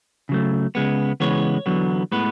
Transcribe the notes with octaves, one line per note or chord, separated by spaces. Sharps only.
C#3 F#3 A3
C#3 G#3 B3
C#3 E3 G#3 B3 C#5
E2 D3 F#3 B3
A2 G#3 B3 B4